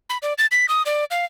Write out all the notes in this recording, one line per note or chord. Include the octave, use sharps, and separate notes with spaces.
B5
D5
A6
B6
D#6
D5
F5